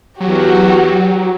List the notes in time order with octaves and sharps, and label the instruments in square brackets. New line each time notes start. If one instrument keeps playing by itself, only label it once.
[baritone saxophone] E2 [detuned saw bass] F#3 [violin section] F#4 [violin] G4